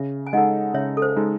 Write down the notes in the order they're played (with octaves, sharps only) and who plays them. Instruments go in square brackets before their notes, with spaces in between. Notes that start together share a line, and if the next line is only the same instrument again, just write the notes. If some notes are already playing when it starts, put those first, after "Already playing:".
Already playing: [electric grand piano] C#3 [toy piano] E5
[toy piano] G#5
[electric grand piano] G#3 D#4 A4 [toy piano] D#5 F#5
[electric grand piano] C#3 [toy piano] C#5 E5
[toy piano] A4
C5
[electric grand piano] G#3 D#4 A4